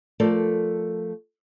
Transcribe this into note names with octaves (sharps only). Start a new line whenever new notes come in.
F3 A3 A4 A#4 D5